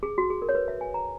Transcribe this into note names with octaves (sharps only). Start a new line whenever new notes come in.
G#4
F#4
G#4
A#4
C#5
B4
E5
G#5
A#5